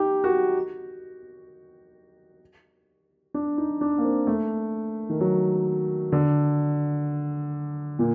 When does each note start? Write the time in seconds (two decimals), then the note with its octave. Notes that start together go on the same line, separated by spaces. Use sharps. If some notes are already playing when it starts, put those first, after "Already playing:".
Already playing: D#4 G4
0.24 F#4
3.34 D4
3.58 D#4
3.81 D4
3.98 A#3
4.04 C4
4.27 A3
5.09 D#3
5.20 F#3
6.12 D3
7.99 A#2